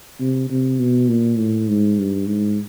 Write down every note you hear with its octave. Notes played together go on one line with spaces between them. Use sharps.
C3
C3
B2
A#2
A2
G#2
G2
G#2